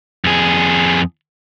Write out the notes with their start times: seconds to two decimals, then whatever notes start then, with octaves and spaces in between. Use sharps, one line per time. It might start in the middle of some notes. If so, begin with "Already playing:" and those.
0.25 F2 G#4